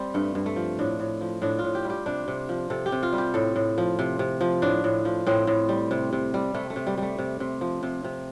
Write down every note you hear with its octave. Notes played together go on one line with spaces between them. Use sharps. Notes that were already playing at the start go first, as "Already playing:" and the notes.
Already playing: G3 C4
G2 A3
G2
A3
F3
A2 D4
A2
F3
A2 D4
F4
A2
G4
G3
G4
C3 D4
C3
F3
C3 A4
G4
C3
F4
G3
G4
A2 A4
A2
F3
C3
C3
F3
A2 D4
A2
F3
A2 C4
A2
G3
C3
C3
G3
C3 A3
A3
C3
G3
G3 A3
C3
C3
F3
C3
C3